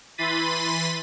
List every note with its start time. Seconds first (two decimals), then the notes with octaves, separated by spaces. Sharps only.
0.18 E3 B5 C6 A6 B6 D#7